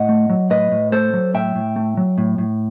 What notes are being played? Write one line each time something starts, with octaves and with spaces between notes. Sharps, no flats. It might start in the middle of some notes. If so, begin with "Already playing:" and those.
Already playing: A2 D#5 F#5
A3
F#3
A2 B4 D#5
A2
A3 A4 C5
F#3
A2 E5 G5
A2
A3
F#3
A2
A2